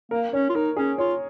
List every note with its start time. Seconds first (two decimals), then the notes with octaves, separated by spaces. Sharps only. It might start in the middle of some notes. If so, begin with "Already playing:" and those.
0.11 A#3 A#4
0.33 C#4 C#5
0.49 F4
0.55 D#4 A#4
0.77 C#4 G#4
0.98 F4 C#5